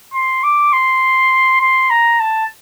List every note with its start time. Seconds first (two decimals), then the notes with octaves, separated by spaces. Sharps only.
0.14 C6
0.44 D6
0.73 C6
1.61 C6
1.90 A#5
2.20 A5